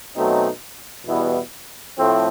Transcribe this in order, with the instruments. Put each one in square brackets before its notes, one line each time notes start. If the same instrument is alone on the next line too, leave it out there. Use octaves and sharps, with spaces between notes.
[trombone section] B2 F#3 A3 C4 D#4
E2 B2 G3 B3 E4
A2 F3 A3 C4